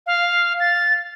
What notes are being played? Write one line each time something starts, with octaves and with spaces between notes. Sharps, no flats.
F5
A6